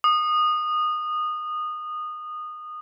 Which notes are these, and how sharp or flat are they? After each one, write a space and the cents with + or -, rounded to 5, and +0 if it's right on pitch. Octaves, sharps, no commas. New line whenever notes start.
D#6 -20